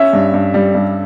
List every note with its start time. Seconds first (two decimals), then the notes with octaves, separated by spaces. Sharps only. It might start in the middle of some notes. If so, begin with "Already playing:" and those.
Already playing: C#4 E5
0.13 G2
0.34 G2
0.54 G3
0.75 G2